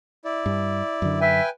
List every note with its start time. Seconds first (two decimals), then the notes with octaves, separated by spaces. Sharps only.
0.25 E4 D5
0.46 G2
1.02 F#2 D3
1.21 B4 E5 G5 G#5